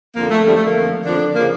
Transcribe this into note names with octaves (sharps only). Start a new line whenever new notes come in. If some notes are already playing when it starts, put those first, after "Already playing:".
F2 D3 F3 A#3
A3
F2 D3 F3 G3
A3
A#3
F2 D3 F3
F2 D3 F3 D4
C#3 F3 A#3